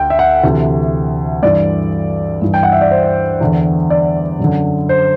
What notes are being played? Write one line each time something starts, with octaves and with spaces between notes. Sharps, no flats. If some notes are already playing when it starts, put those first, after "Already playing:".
Already playing: D2 D3 G5
E5
F#5
D2 C3 E3
G2 E3 D5
G2 E3
G5
F#5
E5
D5
C5
E2 D3
D5
F#2 D3
C5